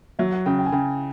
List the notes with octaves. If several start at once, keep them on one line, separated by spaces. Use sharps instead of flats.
F#3 E5
F#5
C#3 G5
G5
G#5
C#3 G5